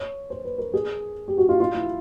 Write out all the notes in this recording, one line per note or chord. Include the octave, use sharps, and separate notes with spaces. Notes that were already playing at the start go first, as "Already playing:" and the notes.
Already playing: C#5
C5
B4
A#4
G#4
G4
F#4
F4
F4
E4